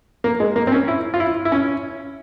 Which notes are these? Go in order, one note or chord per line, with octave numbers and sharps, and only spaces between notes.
A#3
G#3
A#3
C4
C#4
E4
F4
E4
E4
C#4